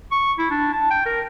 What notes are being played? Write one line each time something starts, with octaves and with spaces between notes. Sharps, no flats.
C#6
E4
D4
A5
G5
A#4